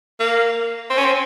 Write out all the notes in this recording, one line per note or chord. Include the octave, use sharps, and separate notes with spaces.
A#3
C4
C#4
C4